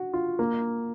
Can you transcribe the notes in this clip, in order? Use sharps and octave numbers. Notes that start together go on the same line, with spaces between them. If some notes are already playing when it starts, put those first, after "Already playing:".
Already playing: F#4
F4
A#3